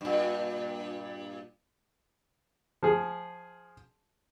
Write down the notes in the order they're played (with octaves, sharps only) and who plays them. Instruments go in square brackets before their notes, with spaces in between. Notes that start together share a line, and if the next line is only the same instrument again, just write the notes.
[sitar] G2 A#2
[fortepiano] F3 G#4